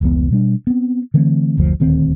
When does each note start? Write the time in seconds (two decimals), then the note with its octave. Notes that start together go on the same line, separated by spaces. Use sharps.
0.01 F1 C#2 E3 B3
0.31 B2 G3 D4
0.67 B3 C4
1.14 D3 E3 A3 C4
1.57 F#1 D2 D3 F3
1.80 D#1 D2 D#3 C4